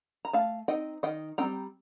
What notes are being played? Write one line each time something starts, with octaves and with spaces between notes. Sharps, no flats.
A#5
A3 F5 A5
C4 D#4 D#5 G5
D#3 D#5 G5
G3 C4 D#4 G5 A#5